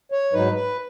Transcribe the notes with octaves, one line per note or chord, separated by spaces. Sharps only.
C#5
G#2 F#3 D#4 B4
B4